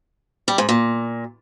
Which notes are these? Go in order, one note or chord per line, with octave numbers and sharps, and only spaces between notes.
G3
G#2
A#2